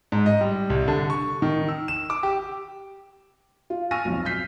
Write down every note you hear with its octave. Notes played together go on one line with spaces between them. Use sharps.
G#2
D#5
G3
C2
D3
C#6
D#3
E6
E7
D6
G4
F4
G#5 C#6 E6 F6 A#6 D#7
B1 F2
F6 G6 B6 C7